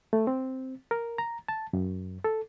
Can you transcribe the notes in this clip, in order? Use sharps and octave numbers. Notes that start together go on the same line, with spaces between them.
A3
C4
A#4
A#5
A5
F#2
A4